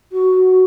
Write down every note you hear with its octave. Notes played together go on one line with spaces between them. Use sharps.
F#4